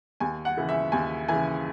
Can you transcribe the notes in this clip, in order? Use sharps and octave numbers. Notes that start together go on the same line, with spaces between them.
D#2 G#5
F#5
C#3 E3
E5
D#2 G#5
C#3 E3 G#5